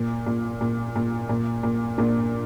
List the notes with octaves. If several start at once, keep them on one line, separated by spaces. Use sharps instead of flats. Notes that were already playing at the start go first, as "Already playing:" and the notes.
Already playing: A#2
A#2
A#2
A#2
A#2
A#2
A#2 A#3 D4